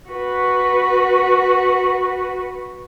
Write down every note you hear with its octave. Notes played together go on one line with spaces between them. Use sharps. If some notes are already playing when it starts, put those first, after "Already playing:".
F#4 B4